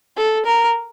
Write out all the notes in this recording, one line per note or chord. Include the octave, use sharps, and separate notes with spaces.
A4
A#4